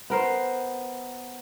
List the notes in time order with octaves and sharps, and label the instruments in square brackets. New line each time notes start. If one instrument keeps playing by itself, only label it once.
[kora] B3 A#4 C5